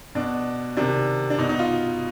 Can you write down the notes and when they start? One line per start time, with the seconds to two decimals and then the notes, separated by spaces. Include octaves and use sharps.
0.15 B2 D4
0.77 C3 D#3 D4
1.30 D4
1.38 B2 D#4
1.49 D#4
1.59 F4